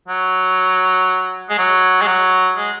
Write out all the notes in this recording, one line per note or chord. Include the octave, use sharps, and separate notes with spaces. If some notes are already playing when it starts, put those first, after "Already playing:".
F#3
G#3
F#3
G#3
F#3
G#3